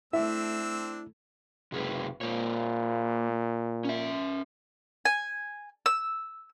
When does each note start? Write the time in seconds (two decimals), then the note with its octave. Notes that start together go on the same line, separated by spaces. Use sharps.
0.13 A3 C4 D4 E4 E5 E6
1.72 F#1 C3 G#4 B4
2.21 A#2 A#3 C5 C#5
3.85 C#4 E5
5.05 G#5
5.86 E6